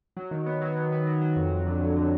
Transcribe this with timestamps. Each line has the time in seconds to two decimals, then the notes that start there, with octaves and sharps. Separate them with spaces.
0.17 F#3
0.31 D#3
0.46 B3
0.61 F#3
0.76 B3
0.92 B3
1.07 F#3
1.21 F#3
1.36 F2
1.51 F2
1.67 D3
1.81 F2
1.97 D3